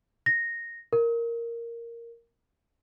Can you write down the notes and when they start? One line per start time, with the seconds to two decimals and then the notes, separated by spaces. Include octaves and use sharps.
0.26 A#6
0.93 A#4